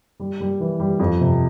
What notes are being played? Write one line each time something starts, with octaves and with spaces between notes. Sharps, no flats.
G3
G3
E3
G3
F2
C3